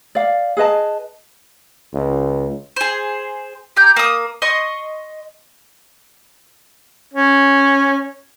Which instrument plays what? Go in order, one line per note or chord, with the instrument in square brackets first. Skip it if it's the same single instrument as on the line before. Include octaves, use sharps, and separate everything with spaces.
[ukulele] D5 F5
G#4 B4 D#5 A5
[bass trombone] C#2
[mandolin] G#4 C5
G4 A#5 G6
A#3 D#6
D#5 C6 C#6 D#6
[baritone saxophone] C#4